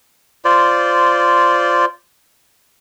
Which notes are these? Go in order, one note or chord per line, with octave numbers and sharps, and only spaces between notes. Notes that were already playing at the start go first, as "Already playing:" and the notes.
F4 C5 D5